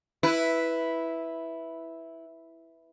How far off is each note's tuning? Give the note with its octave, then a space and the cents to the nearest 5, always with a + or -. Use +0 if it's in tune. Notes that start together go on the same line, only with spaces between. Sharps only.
E4 -5 B4 +0